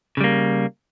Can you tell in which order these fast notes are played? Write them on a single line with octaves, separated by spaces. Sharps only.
C#3 G3 A#3